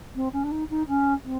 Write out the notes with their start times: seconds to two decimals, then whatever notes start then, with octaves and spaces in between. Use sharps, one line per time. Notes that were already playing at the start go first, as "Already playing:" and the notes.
0.15 C4
0.33 C#4
0.44 D4
0.51 D#4
0.70 D#4
0.88 C#4
1.24 C4